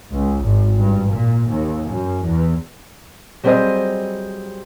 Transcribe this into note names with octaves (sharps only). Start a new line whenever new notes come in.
C#2
G#1
G2
A#2
D#2
F#2
E2
F#3 G3 C4 G#4 C5 D#5